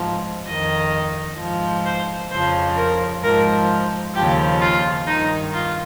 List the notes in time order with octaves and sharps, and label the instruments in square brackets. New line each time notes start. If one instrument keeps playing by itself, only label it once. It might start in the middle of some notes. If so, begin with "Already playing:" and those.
Already playing: [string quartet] G#2 F3
F2 D#3 D#5
G#2 F3
C5
F2 C#3 F3 C5
A#4
G#2 F3 A#4
D#2 C#3 F3 G4
F4
G2 D#3 D#4
F4